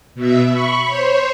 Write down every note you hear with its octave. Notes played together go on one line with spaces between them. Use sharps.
B2 E5
B5 C#6
C5 C#5